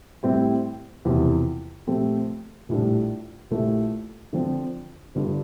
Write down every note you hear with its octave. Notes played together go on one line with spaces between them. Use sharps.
A2 G3 C4 E4 G4
E1 E2 C3 F3 A#3
A#2 F3 A3 C4 G4
A#1 A2 G3 D4
A#1 A#2 A3 E4 G4
D3 F3 C4
G1 G2 D3 G3